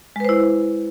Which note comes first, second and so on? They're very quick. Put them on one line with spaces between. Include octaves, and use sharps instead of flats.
G#3 B4 C5 E4